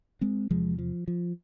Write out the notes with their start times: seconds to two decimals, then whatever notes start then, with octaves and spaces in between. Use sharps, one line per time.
0.21 G#3 C4
0.51 E2 C3 F3 G#3
0.78 F3
1.08 F3